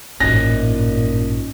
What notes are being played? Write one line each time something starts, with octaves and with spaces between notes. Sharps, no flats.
A1 G2 A#2 C#4 D#4 A#6